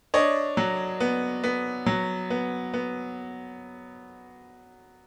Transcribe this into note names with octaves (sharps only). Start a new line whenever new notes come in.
D4 C#5 D#5
F#3
B3
B3
F#3
B3
B3